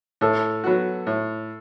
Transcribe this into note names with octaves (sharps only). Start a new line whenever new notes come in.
A2 A4
F#3 B3 F#4
A2